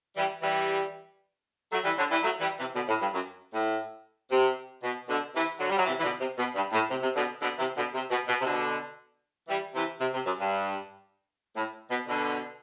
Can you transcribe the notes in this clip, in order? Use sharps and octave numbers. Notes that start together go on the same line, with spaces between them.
E3 G3
E3 G3
F#3 A3
E3 G3
D3 F#3
E3 G3
F#3 A3
E3 G3
C3 E3
B2 D3
A2
G2
F#2
A2
C3
B2
B2 D3
C3 E3
D3 F#3
G3
F#3
C3 E3
E3
B2 D3
C3
B2
G2
A2
C3
C3
B2 D3
B2 D3
C3 E3
B2 D3
C3
B2
B2
C3
B2 D3
E3 G3
C3 E3
C3
C3
F#2
G2
A2
B2
B2 D3